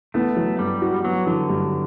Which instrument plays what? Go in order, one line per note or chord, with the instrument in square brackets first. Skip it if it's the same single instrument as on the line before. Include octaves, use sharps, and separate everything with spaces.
[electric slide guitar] A3 [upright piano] B3
[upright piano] F#3
[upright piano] G2 [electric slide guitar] G3
[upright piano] F#4
[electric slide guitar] F#3 [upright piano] B3
[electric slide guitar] D3 [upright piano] F#3
[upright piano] G2